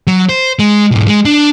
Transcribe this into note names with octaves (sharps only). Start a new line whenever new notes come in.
F#3
C5
G#3
B1 G#2
G#3
D4